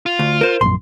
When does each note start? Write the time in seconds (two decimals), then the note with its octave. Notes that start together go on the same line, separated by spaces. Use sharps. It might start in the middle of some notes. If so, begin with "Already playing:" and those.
0.06 F4
0.19 D2
0.41 A#4 C5
0.61 A#1 F#2 C6